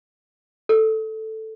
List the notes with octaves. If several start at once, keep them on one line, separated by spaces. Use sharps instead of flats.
A4